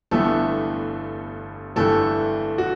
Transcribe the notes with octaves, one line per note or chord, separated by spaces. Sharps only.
G1 G2 E3 A3 B3 A4
G1 G2 E3 A3 A4
F#4